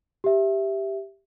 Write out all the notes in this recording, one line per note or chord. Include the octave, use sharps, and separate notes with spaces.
G4 E5